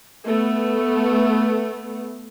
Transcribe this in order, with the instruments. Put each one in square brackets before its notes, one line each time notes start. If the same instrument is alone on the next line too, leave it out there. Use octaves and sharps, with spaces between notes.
[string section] A3 B3